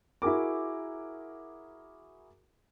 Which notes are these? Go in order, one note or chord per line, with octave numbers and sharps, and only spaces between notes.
E4 F#4 G#4 A#4 D6